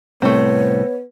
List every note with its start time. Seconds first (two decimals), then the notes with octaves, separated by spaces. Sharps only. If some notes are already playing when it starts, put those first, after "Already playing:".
0.22 C2 A2 A3 B3 C4 C#5